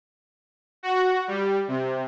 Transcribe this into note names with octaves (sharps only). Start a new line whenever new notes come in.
F#4
G3
C3